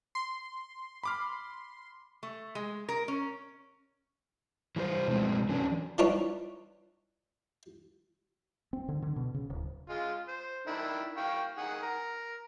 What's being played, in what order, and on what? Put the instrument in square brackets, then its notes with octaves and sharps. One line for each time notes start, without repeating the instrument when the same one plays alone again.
[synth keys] C6
[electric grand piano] B5 D6 F6
[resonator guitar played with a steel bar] A3
G#3
A#4
C#4
[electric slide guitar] E3 G3 D#4 C5
B2 G#3 A3 C4
D3 E3 F#3 C#4 D4
[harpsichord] E3 F3 G3 D4 D#4 C#5
[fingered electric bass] C4
D3
D3
B2
C#3
D1
[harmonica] G#3 F4
C5
D#3 D4 E4
F5 G5 C#6
D#3 G#4 F#5
A#4